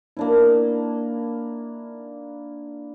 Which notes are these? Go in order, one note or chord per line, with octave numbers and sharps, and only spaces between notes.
A#3 D4 E4